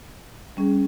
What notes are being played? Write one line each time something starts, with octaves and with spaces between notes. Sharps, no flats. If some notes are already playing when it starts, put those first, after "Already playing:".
G3 C#4 G#4